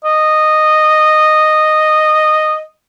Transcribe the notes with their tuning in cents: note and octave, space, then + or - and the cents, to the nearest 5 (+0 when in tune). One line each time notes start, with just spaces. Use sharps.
D#5 -10